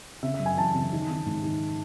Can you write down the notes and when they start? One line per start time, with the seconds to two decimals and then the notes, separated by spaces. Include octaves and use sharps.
0.23 C#3 E5
0.34 E5
0.40 F#2
0.46 G#5
0.57 E3 A5
0.75 C#3
0.93 D#3
1.09 D#3
1.26 G#2
1.43 D#3